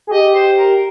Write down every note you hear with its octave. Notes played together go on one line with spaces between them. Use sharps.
G#4
G4 D#5
C5
A#4